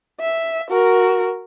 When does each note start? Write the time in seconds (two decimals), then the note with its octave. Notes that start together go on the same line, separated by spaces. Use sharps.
0.20 E5
0.70 F#4 A#4